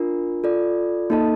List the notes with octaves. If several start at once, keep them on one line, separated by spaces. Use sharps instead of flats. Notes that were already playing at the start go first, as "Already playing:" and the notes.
Already playing: D4 F4 A#4
F4 A4 D5
A#3 D#4 A4 D#5 A5